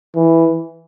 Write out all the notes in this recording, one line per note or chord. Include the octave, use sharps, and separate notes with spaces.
E3